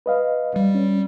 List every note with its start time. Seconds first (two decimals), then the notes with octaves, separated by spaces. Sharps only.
0.06 B4 D#5 F5
0.56 G3
0.75 C#4